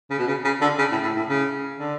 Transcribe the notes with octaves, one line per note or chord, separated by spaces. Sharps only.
C#3
B2
C#3
C#3
D3
C#3
A2
A2
A2
C#3
D3